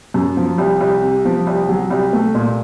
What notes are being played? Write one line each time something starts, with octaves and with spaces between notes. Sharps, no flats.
F#2
F3
C2
C2
C3
F3
C2
F#3
C2
A3
A#2